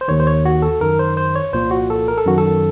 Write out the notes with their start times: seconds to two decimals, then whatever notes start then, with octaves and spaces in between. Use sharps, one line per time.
0.01 C5
0.08 D#2 D#3 C#5
0.20 C5
0.27 C#5
0.45 F#4
0.62 A4
0.81 F#2 D#3 A#4
0.99 C5
1.17 C5
1.36 C#5
1.53 C2 A#2 F3 C5
1.71 F#4
1.90 A4
2.08 A#4
2.18 A4
2.25 F#2 D#3 F#4
2.38 A4